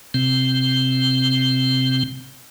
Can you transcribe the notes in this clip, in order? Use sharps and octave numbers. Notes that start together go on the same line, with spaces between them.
C3 C4